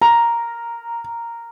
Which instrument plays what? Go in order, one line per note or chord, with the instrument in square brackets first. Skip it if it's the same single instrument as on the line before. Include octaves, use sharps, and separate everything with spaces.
[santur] A#4 [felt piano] A#5